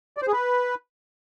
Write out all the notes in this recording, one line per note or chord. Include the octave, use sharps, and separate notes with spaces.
D5
C5
G#4
B4